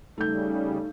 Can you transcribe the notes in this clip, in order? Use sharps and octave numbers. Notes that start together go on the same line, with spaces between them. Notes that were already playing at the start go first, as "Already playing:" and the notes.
C#3 G3 A3 D#4 G6